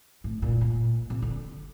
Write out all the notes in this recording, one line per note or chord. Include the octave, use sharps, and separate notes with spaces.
A2
A#2
A#2
C3
D3